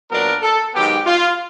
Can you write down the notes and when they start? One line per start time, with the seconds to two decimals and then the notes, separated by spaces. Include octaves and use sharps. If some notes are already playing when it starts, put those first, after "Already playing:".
0.10 A#2 F#3 B3 D4 A#4
0.42 A4
0.75 G#2 D#3 F#3 B3 G4
1.06 F4